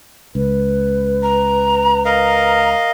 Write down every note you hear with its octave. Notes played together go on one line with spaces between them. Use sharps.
C#2 B4
A#5
A#4 D#5 F5 A#5